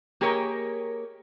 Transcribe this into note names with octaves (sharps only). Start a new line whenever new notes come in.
A#3 G4 G#4 A#4 C#5 D#5